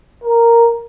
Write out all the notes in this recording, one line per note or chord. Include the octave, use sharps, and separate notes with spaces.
A#4